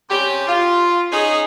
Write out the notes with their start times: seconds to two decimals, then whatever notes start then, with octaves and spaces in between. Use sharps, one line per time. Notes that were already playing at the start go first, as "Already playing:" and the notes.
0.10 C3 C#4 G4
0.47 F4
1.12 C#4 D#4 G#4